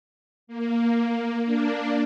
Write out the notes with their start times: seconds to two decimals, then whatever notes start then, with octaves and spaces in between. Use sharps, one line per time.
0.47 A#3
1.43 A#3 D4